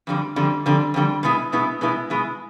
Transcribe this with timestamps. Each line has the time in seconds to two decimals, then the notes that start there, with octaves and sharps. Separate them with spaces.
0.07 F2 D3 G3
0.36 F2 D3 G3
0.66 F2 D3 G3
0.94 F2 D3 G3
1.23 B2 G#3 B3 E4
1.52 B2 G#3 B3 E4
1.81 B2 G#3 B3 E4
2.10 B2 G#3 B3 E4